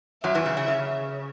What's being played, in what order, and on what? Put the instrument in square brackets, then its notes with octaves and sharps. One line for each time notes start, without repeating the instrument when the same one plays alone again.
[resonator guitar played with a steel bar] F#2 F#3 [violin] E5
[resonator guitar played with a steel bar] E2 E3
C#3
C#3
C#3